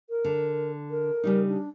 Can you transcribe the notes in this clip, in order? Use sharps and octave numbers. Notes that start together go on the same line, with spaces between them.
A#4
D3
A#4
C#3 G3 D#4
D4